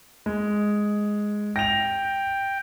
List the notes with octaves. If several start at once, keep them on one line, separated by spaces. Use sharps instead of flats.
G#3
G5 A#6 F7